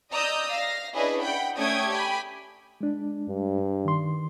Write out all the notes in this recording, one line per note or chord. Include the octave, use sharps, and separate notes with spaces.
D5 D#5 A#5 D#6 E6 G6
F5 A#6
C#4 D4 E4 G#4 B4 D#5
F#5 G5 B5
A3 C#4 D5 G5 D#6 G#6
G4 G5 G#5 B5
G#3 D4
G2
D#3 C6